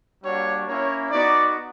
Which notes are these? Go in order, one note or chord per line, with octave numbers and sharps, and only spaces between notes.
G3 A#3 D4 F#4 C#5
A#3 C#4 E4 C#5
B3 D#4 F#4 D5